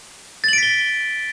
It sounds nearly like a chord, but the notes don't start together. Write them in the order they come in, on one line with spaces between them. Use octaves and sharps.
A6 F#7 D7 B6 G7